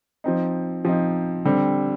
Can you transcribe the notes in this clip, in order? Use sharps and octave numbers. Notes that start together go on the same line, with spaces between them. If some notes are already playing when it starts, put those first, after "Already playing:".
F3 C4 D#4
F3 C4 D#4
D3 G3 C4